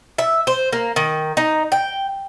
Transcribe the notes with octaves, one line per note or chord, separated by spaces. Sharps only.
E5
C5
A#3
D#3
D#4
G5